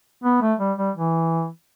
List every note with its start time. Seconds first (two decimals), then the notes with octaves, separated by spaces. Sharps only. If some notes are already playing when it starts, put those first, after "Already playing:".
0.24 B3
0.41 A3
0.59 G3
0.78 G3
0.96 E3